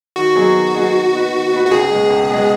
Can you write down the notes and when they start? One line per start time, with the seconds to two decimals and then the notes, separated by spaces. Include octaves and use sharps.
0.16 D#3 F#4
0.35 F#3 B3 D#4 G#4
0.55 D#3
0.74 F#3 B3 D#4 G#4
0.94 D#3
1.13 B3 D#4 B4
1.32 D#3
1.52 B3 D#4 B4
1.66 F#4
1.71 C#2 G#4
1.91 B2 G#3
2.10 C#2
2.29 B2 G#3